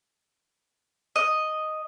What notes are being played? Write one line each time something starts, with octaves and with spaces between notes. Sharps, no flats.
D#5